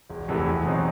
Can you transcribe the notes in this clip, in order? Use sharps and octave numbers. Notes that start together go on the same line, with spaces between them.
E1
E2 C3 E3 A3
E2
B2 F#3 C4 D#4